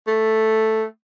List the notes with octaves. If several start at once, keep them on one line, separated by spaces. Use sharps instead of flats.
A3